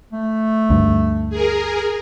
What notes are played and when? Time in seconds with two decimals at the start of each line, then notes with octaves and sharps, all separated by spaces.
0.13 A3
0.70 D2 G2
1.30 G#4 A#4